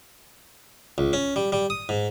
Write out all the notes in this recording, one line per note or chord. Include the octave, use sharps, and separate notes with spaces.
C#2
C#4
G3
G3
D#6
G#2